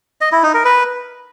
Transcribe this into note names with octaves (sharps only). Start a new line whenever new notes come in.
D#5
E4
D#4
A#4
B4